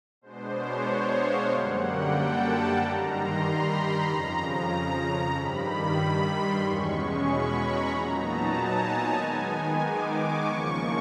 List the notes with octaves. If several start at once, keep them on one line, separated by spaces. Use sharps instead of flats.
B2 G#3 B3 D4 C5
C#5
F5
F#2 D3 G3 A#3 F#5
G5
A5
G2 D#3 G3 A#5
C6
B5
A#5
F2 C#3 F3
A#5
G2 D#3 G3 B5
C6
E2 B2 G#3 C#4 C#6
C#6
B5
A#5
A#2 F#3 B3 D#4 A#5
A5
G#5
G#5
D#3 G#3 B3 D#4
D6
C#6
E2 C#3 F3 A#3